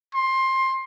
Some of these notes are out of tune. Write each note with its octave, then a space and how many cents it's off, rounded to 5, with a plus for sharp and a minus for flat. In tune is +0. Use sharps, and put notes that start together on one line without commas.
C6 +20